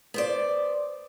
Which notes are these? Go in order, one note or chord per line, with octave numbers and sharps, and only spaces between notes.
B3 C5 D5